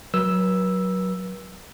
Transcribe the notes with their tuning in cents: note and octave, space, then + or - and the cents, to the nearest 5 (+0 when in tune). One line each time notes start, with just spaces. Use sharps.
F#3 +0 B4 -45 E6 +0